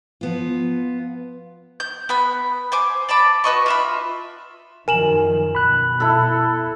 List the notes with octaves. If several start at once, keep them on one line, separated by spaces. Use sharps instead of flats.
F3 B3 F4
G6
B3 B5 F#6
C5 G#5 D6
D5 A5 B5 D6
F#4 B4 D#5 C#6
F4 E5 B5
F#2 D#3 F3 A#4 G#5 E7 F#7
B2 B5 F#6
E4 A4 E6